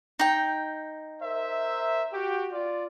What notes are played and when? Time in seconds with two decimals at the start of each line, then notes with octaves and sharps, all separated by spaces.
0.19 D#4 G5
1.22 A#4 C5 E5
2.13 F#4 G4
2.51 F4 D5